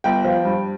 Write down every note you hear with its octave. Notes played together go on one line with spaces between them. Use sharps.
G1 G5
F3
G2